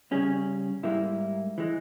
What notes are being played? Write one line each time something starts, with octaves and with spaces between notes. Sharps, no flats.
C#3 G3 C#4 G#4
G#2 G3 A#3 E4
E3 G#3